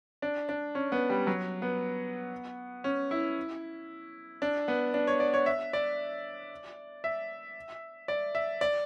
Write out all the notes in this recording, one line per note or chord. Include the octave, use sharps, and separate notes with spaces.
D4
D4
C#4
B3
G3
F#3
B3
C#4
E4
D4
B3
D4
C#5
D5
C#5
E5
D5
E5
D5
E5
D5